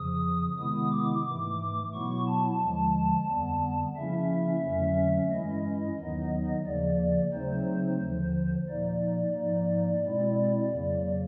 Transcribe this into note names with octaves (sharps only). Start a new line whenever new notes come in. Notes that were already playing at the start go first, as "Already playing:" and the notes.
Already playing: F2 C#3 F3 D#6
C3 D#3 G#3 B3 E4 D#6
D6
G#2 E3 A3
B2 F#3 B3 E4 C#6
A5
D#2 D3 F3 G#3
F2 D3 G3 B3
C#3 F3 A#3 C#4 E4 E5
F2 D3 F#3 A3 C#4
G2 E3 G#3 C#4 E4 D#5
D#2 D#3 F#3 B3 D#4
D#2 C#3 F3 A#3 D5
C#3 F#3 A3 C4 D#4 C5
D#2 D3 F3
A#2 F3 A#3 D#4 D5
G#2 F3 A#3 D#4
B2 G#3 C4 E4
F2 C#3 F#3 A#3